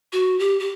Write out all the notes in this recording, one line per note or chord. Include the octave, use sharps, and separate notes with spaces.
F#4
G4
G4